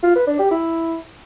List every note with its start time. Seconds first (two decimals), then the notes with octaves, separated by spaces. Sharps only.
0.03 F4
0.15 B4
0.27 D4
0.39 G4
0.51 E4